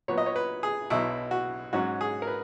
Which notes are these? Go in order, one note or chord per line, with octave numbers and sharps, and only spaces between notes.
A#2 F#3 B3 C#5
D#5
C#5
B4
G#4
B1 B2 F#3 E4
F#4
G#2 F#3 C#4 F#4
G#4
A#4
B4